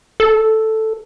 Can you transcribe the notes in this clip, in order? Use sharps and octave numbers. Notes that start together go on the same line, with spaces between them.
A4